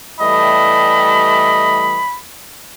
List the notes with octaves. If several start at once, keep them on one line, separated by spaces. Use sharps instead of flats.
E3 G3 A3 D#5 B5